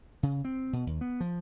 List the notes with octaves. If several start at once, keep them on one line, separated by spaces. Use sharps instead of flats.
C#3
C4
B2
D#2
B3
F3